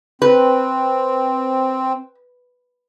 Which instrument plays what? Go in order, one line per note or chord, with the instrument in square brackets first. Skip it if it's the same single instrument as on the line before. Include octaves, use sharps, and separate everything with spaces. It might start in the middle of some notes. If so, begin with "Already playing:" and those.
[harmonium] C4 [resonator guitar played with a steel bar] B4